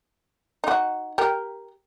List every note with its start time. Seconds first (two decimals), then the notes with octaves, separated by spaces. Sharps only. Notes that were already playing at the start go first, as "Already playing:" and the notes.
0.64 D#4 F#4
1.18 G4 A#4